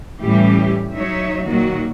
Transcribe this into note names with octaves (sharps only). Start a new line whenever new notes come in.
A2 E3 G3 C#4 G4
F#3 D#4 C#5 E5
A#2 D#3 F#3 A#3 F#4